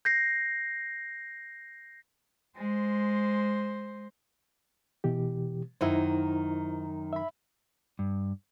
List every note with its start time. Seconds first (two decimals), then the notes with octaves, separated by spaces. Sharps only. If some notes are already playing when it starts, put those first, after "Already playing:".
0.05 G6 A#6 C7
2.56 G#3 C5
5.04 B2 E3 G4
5.81 F#2 D#3 D#4 E4 C5
7.13 E5 B5
7.99 G2